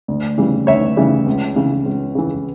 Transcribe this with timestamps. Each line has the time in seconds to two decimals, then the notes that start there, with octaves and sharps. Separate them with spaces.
0.08 D2
0.38 C#3 E3 G3
0.67 D2 C#5 E5
0.97 C#3 E3 G3
1.26 C#2
1.56 C#3 E3
1.86 C#2
2.15 C#3 E3